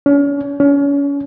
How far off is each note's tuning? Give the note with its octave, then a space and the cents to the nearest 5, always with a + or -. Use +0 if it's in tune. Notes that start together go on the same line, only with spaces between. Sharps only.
C#4 +40
C#4 +35